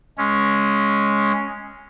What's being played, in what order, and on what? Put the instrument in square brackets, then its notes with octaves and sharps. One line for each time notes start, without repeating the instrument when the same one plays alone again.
[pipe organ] G#3 C#4